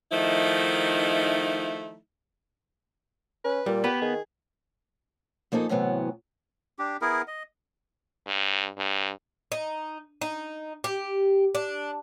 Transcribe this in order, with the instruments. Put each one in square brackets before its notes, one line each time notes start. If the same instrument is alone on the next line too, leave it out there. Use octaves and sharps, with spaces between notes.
[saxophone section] D#3 F3 A3 D#4 E4
[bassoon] C#4 [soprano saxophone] B4
[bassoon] A#2 [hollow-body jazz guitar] G3
[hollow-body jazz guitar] B3 B4 [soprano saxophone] G4
[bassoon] D#3 [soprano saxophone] G#4
[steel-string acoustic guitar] F3 A#3 D#4 G#4 A4
A2 C3 E3 F#3 B3
[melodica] D4 G4
B3 E4 G#4 A#4
D#5
[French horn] G2
G2
[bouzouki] D#4
D#4
G4
D4